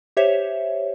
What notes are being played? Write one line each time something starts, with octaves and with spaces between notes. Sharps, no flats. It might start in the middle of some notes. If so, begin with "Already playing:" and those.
G4 C5 C#5 E5